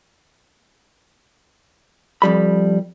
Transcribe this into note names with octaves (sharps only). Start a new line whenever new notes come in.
F2 G3 B5